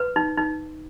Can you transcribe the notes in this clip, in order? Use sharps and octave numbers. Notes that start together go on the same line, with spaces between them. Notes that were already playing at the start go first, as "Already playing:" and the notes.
Already playing: B4
D#4
D#4